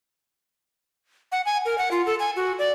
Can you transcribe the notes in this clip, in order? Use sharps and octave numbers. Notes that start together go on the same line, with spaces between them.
F#5
G#5
A#4
F#5
F4
A4
G#5
F#4
D5